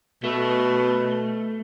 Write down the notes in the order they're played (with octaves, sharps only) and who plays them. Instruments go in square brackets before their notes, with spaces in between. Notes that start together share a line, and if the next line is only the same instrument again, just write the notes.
[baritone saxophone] B2 [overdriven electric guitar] A3